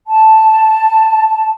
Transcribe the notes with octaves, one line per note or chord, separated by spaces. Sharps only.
A5